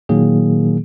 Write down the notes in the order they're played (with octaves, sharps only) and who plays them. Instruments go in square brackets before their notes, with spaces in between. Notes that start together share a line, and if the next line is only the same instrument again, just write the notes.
[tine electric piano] A#2 D#3 F#3 A#3 G#4